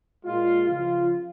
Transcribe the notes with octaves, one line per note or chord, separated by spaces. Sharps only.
A#2 G#3 F4
C#2 C#3 F3 F4